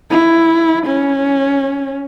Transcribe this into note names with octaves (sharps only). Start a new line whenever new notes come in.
E4
C#4